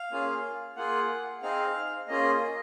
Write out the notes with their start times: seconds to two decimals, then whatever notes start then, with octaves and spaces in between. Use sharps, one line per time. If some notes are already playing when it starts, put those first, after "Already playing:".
Already playing: F5
0.11 A#3 C#4 F4 G#4
0.76 A#3 F4 G#4 F#5
1.42 C4 D#4 G#4 F5
2.08 A#3 C#4 F4 G#4 D#5